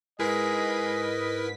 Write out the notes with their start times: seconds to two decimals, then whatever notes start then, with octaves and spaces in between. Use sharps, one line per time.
0.19 G#2 G#3 E4 A#4 B4 D#5 B6